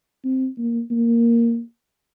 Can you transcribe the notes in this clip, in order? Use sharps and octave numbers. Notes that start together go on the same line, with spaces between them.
C4
A#3
A#3